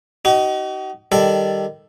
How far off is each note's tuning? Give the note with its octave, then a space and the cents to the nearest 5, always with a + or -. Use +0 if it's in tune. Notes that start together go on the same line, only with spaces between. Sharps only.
D#4 +0 F#4 +45
D#3 -5 G3 +0 A4 +0